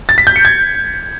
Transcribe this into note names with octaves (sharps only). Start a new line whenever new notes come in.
A6
B6
G6
C#7
G#6